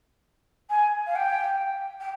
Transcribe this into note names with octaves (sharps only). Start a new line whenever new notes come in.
G#5
F5
G5
G5